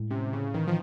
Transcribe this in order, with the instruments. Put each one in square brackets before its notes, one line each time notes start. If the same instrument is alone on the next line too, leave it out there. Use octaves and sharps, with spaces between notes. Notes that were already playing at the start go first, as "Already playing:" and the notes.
Already playing: [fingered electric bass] A2 G#3
[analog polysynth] C3 [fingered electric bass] C#4
[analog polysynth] C#3
[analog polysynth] D#3 [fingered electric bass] E3
[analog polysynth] F3